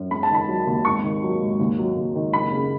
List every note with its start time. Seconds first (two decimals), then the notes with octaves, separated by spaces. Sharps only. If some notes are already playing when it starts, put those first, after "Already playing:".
Already playing: F#2
0.10 E1 B5
0.23 A5
0.30 D#3 B5
0.48 F#3
0.67 D#2
0.85 G#1 C#6
1.04 D#3
1.22 F#3
1.41 G#2
1.60 D#2
1.78 F#3
1.96 D#2
2.15 D#3
2.33 F#1 B5
2.52 C#3